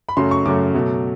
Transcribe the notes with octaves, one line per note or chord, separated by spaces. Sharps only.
B5
F#2 C#3 F#3 A3 C6
C#6
F#2 C#3 F#3 A3 D6
B2 F#3 A3